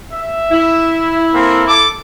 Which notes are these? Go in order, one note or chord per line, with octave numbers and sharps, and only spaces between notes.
E5
E4
A#3 C4 A4
A4 D6